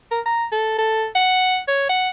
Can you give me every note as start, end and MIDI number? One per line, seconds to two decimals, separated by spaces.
0.11 0.20 70
0.26 0.45 82
0.52 0.75 69
0.78 1.06 69
1.15 1.58 78
1.68 1.88 73
1.89 2.09 78